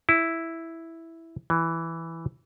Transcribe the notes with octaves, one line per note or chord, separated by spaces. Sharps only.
E4
E3